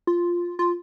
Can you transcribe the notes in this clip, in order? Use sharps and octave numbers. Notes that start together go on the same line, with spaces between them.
F4
F4